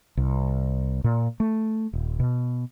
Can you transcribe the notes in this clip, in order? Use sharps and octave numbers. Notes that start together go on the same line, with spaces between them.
C2
A#2
A3
D#1
B2